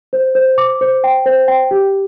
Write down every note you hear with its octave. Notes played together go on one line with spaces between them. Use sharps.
C5
C5
D6
C5
G5
C5
G5
G4